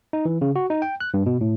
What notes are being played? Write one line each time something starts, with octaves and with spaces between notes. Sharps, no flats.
D#4
E3
C#3
F#4
D#4
G5
F#6
G2
B2
A2